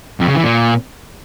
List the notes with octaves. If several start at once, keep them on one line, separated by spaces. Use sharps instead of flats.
F2
C#3
E3
A#2